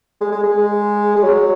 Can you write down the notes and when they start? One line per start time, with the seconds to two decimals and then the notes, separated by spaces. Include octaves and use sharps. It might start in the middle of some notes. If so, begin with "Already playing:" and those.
0.21 G#3
0.32 G#3
0.43 G#3
1.16 G#3
1.22 F#3